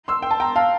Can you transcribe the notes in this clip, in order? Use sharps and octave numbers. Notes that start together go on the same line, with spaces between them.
C6 E6
G5
A5
G5 A#5
F5 A5